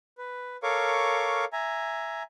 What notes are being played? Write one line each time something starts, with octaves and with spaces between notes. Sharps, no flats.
B4
A4 A#4 C#5 F5 C#6 D6
E5 G#5 A#5